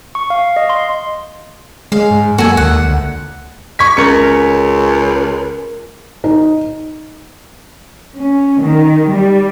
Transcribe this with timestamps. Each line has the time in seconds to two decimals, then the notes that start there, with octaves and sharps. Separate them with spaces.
0.15 C#6
0.30 F5
0.56 D#5
0.69 C6
1.92 G#3 F5
2.11 G#2
2.38 F#2 A#3 F#4 A4 G#5
2.57 D#2 F#5
2.84 D2
3.79 C#6 G#6 B6
3.97 C#2 C#4 A#4 C#7
6.24 D#4
8.16 C#4
8.62 D#3
9.11 G3